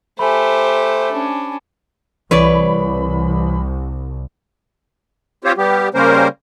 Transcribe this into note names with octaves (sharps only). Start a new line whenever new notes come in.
A3 G4 C5 G#5 B5
C#4 D4
C2 E3 B4 C#5 D5 B5
C4 F4 G4 C5 C#5
G3 B3 G4
C#3 G3 A#3 C#4 A#4 C5